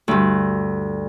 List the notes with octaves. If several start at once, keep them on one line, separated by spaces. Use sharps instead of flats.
D2 G2